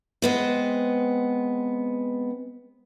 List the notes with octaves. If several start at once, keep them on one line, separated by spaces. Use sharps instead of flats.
G#3 B3 C4